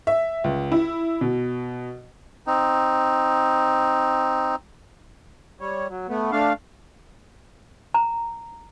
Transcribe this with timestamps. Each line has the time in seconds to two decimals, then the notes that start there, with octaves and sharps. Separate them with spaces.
0.07 E5
0.44 C#2
0.72 E4
1.21 B2
2.47 C4 D#4
5.60 G3 C#5
5.89 F#3
6.09 A3 B3
6.32 A3 D4 F5
7.94 A#5